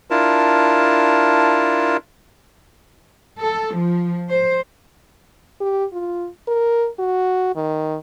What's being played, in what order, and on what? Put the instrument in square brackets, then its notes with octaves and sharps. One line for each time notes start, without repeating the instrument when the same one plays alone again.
[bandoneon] D4 E4 F4 A#4 A5
[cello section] A4
F3
C5
[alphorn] G4
F4
A#4
F#4
D#3